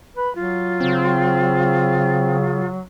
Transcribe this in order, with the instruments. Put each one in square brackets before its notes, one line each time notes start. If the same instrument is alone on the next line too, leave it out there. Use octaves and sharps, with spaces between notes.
[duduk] B4 [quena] B5
[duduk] F#3 [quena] F4
[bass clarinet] C#3 [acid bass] C4